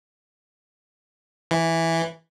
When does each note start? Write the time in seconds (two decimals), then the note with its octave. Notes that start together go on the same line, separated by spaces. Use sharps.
1.51 E3